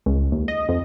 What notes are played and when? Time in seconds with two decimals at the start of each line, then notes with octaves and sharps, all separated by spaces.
0.06 C#2
0.32 D#2
0.48 D#5
0.69 F2